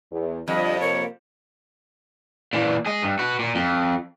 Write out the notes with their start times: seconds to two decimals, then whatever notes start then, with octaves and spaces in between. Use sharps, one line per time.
0.11 E2
0.48 F2 D3 F3 G3 D#5
0.81 C3 A#3 C#5
2.53 A#2 E3
2.86 G#4 D#5
3.03 G2
3.19 F#4 B4
3.39 A#2
3.55 F2